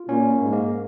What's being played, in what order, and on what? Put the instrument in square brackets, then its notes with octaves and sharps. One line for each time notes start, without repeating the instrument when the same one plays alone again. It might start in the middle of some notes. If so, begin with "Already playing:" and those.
Already playing: [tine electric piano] F4
[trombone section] A#2 [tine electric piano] C#4
[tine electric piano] A#3
[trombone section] G#2
[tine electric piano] A#3